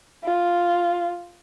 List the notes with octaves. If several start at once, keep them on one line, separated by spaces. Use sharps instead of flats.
F4